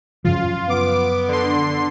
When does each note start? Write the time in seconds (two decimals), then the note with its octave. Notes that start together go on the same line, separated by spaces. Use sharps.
0.25 F#2 C#3 F3 F4
0.70 B3 D6
1.28 D3 C6